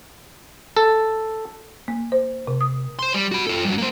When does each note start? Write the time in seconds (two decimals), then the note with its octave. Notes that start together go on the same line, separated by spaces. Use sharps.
0.77 A4
1.88 A#3
2.12 C5
2.47 C3
2.61 D#6
2.99 C5 C6
3.14 G3
3.31 F#4 B5
3.47 F4 A4
3.65 G2 F#3
3.78 A#3 C5